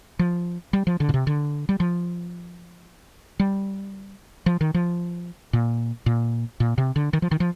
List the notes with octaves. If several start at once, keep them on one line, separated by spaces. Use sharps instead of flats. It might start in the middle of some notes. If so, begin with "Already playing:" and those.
F3
G3
F3
D3
A#2
C3
D3
G3
F3
G3
F3
D#3
F3
A#2
A#2
A#2
C3
D3
D#3
F3
D#3
F3